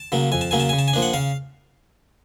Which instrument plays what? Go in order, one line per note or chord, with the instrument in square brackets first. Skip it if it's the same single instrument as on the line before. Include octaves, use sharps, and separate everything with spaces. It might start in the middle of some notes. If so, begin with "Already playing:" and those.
Already playing: [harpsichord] A5
C#3 F#3 A#3
F2 G#5
A5
C#3 F#3 A#3 G#5
A5
C#3 G#5
A5
G#5
F3 A#3 D4
F#5
C#3 F5